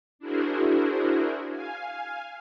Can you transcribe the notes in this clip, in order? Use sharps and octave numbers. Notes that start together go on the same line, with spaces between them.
D4 E4 F#4 G#4 A#4 C5
F5 G#5